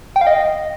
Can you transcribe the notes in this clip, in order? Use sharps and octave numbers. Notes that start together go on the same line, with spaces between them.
G5
F5
D#5